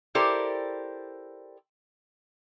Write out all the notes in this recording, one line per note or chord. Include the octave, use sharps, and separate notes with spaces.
E4 G4 A4 A#4 C5 D5